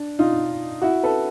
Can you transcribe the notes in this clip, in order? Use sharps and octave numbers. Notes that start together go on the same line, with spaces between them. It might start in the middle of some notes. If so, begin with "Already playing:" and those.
Already playing: D4
D#4 F4
E4 F#4
A4 B4